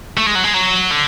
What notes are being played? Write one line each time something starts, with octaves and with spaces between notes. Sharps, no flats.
A3
G#3
F#3
G#3
F#3
D3